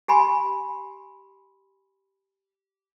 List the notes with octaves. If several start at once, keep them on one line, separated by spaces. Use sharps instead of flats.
G4 G#5 B5 C6